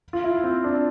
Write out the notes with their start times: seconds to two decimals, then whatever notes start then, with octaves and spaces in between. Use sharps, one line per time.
0.13 F4
0.24 E4
0.44 C4
0.64 D4